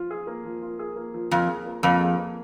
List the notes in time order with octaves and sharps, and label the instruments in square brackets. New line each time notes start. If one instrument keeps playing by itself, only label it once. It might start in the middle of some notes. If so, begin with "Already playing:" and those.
Already playing: [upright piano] F3 F4
G#4
A#3
F3
F4
G#4
A#3
F3
[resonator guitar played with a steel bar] F2 [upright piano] F4
[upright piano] G#4
A#3
[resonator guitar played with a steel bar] F2 [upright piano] A#3
[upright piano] G#4
A#3